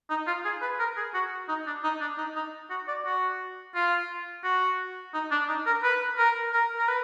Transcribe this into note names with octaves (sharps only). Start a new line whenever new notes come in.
D#4
F4
G#4
B4
A#4
G#4
F#4
D#4
D4
D#4
D4
D#4
D#4
F#4
D5
F#4
F4
F#4
D#4
D4
D#4
A#4
B4
A#4
A#4
A#4
B4